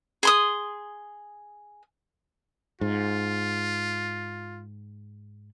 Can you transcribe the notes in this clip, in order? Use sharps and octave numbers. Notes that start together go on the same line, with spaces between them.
G#4 C6 D#6
G#2 F4